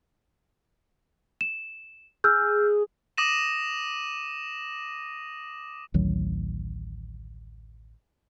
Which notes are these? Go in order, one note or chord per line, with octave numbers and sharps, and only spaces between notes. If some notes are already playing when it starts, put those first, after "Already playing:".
E7
G#4 E6 F6 G6
D6 D#6 A#6 D#7 E7
A1 D2 D#3 F#3